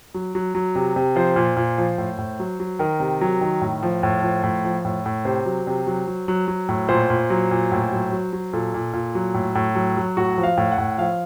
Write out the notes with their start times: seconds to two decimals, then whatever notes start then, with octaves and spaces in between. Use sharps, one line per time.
0.14 F#3
0.35 F#3
0.55 F#3
0.75 C3
0.96 C3
1.16 F3 C5
1.36 A#2
1.56 A#2
1.78 F3
1.98 A2
2.18 A2
2.40 F#3
2.60 F#3
2.79 D#3 A#4
3.00 C3
3.21 F#3
3.41 D#3
3.61 A2
3.83 F3
4.03 A2
4.23 F3
4.44 A2
4.65 F3
4.85 A2
5.06 A2
5.25 C3 C5
5.46 F#3
5.67 C3
5.87 F#3
6.08 F#3
6.28 F#3
6.48 F#3
6.69 A2
6.89 A#2 C5
7.10 A#2
7.30 F#3
7.51 A#2
7.72 A2
7.92 F#3
8.12 F#3
8.33 F#3
8.53 A#2 A4
8.74 A#2
8.93 A#2
9.15 F#3
9.34 A2
9.55 A2
9.75 F#3
9.97 F#3
10.17 A2 F#4
10.38 F3
10.44 F5
10.57 A2
10.72 F#5
10.78 A2
10.98 F3 F5